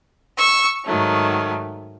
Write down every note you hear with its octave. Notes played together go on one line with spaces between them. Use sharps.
C#6 E6
G#2 D#3 F#3 A3